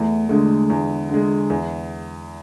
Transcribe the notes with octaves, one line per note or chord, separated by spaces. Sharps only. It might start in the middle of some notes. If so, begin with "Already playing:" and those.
Already playing: E2 A3
D3 G#3 A3
E2
D3 G#3
E2